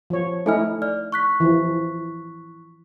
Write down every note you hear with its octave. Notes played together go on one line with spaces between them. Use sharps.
F3 C#5
A3 D#4 E4 A4 G#5 F6
D5 F6
C#6 F#6 B6
E3 F3